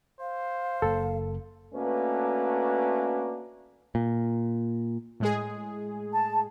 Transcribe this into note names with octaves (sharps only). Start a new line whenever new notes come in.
C5 F5
F#1 A#3 A4
A3 A#3 C#4 D4 F#4 B4
A#2
A2 G#3 G#4
A5